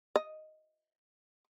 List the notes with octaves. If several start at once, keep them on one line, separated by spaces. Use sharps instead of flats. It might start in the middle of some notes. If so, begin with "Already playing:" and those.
D#5